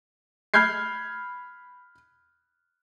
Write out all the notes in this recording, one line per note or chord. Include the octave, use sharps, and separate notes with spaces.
B5 F6 G6 G#6 C7